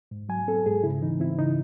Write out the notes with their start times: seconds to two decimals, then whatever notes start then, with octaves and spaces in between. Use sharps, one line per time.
0.11 G#2
0.29 F#3 G#5
0.48 C4 A4
0.66 G#2 G#4
0.83 C#3 E4
1.02 E3 D#4
1.20 C4 E4
1.38 C#3 D#4